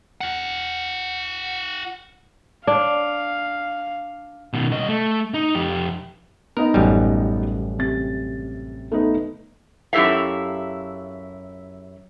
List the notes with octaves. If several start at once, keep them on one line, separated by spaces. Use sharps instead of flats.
F4 F#5
D4 F5
B2 D#3
C2 D#5
A3
D#4
F2 G4
B3 D#4 A#4 D#5
A1 F#2 G3
C3 A6
A3 B3 D#4
F#2 E4 G4 A4 E5 F5